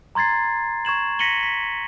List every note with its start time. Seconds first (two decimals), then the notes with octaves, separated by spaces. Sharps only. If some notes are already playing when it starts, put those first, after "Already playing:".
0.15 A#5 C6 G#6 A6 C7
0.85 C#6 G#6 E7 F#7
1.19 A#6 B6 C#7 D#7 F#7 G7
1.43 B6